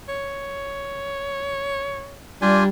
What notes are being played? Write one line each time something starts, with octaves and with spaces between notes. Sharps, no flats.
C#5
G3 D4 F4 G4 G#5